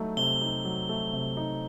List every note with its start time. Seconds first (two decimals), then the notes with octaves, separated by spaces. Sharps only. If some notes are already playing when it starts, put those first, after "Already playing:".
Already playing: F#3 A3 D#4
0.17 C3 G7
0.41 D#4
0.65 F#3
0.89 A3
1.13 C3
1.37 D#4